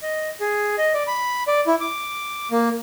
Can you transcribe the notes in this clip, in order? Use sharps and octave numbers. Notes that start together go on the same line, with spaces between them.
D#5
G#4
D#5
D5
B5
D5
E4
D6
A#3